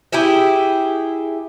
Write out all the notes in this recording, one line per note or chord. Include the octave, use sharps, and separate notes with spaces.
E4 G4 G#4 E5